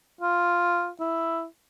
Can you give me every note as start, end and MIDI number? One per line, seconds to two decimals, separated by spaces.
0.21 0.90 65
1.00 1.45 64